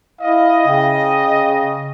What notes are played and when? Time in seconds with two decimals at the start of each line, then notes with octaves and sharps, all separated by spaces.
0.21 E4 D#5 F5
0.68 C#3 G5